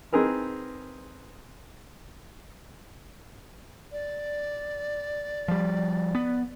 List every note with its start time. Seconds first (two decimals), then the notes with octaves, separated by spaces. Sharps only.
0.12 C4 D#4 G#4 A#4 B4
3.92 D5
5.48 F3 G3
6.15 B3